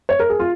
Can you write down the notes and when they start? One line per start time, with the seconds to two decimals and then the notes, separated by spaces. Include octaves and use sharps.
0.09 C#5
0.20 A#4
0.30 G#4
0.40 F4